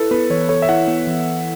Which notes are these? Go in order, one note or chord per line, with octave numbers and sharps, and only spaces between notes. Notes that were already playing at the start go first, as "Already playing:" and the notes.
Already playing: E4 A4 B4
B3 B4
E3 C#5
A4 C#5
E5
E4 F#5
B3
E3